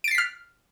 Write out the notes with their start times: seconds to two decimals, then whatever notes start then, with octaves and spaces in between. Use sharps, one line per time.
0.04 D7
0.08 A6
0.11 C7
0.15 B6
0.18 F6